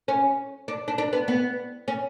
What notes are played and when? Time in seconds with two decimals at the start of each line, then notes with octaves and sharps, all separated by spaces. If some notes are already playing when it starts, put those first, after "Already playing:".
0.08 C#4
0.68 D4
0.88 D4
0.98 D4
1.13 B3
1.28 B3
1.88 C#4